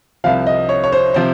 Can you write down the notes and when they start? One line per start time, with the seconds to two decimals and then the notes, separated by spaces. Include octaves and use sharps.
0.24 C2 C3 F3 F5
0.47 D#5
0.69 C#5
0.84 C#5
0.92 C5
1.14 C3 F3 C5